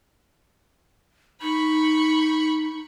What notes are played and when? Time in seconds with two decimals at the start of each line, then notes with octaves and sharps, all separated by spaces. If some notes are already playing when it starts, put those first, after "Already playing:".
1.42 D#4 B5 C#6